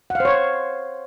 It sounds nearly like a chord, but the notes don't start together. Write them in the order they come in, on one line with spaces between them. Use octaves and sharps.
F#5 F5 C5 C#5